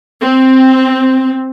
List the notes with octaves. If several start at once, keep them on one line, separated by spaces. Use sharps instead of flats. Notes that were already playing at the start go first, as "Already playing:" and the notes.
C4